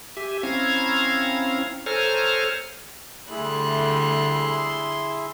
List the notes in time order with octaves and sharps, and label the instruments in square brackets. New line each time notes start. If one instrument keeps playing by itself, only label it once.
[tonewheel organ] G4 E5 G#5
C4 C#4 E4 F5 A#5 G#6
A4 C5 C#5 G#5 A#5 F6
[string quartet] D3 G3 F#6 [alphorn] A3 [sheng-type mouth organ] E4 G#4 E5 [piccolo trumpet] C6